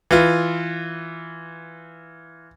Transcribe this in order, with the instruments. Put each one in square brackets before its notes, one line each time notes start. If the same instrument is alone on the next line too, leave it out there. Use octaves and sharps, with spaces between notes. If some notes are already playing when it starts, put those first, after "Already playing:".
[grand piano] E3 F4